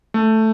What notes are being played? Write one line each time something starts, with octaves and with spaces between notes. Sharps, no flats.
A3